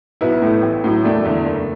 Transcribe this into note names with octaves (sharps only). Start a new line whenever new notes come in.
B1 B3 E4
A2 A3
A1
A2 F#3
E1 A3 D4
E2 D3
F#1